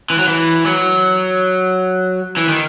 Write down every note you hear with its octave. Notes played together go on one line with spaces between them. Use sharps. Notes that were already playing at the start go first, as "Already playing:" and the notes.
E3
F#3
E3
F#3
E3
D#3